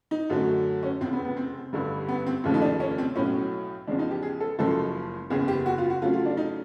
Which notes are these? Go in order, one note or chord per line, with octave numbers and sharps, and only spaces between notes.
D#4
F#2 D3 F#3 A3
C#4
F1 E2 C#3 C4
B3
B3
C4
A1 G2 D3 G3
B3
C4
F1 D#2 C#3 F3 A3
D#4
D4
C#4
C4
B1 A2 F#3 C#4
E2 C#3 F3 G#3 D4
D#4
G4
G#4
A4
F#1 F#2 C#3 F3 G#3 A4
F#1 E2 C#3 G#4
G4
F#4
F4
F#4
F2 C#3 F#3 A3 F4
F4
D4
D#4